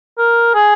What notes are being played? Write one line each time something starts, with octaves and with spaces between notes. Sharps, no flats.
A#4
G#4